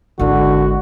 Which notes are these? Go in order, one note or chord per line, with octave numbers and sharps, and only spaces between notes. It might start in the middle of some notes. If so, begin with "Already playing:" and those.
G#1 D3 E4 F#4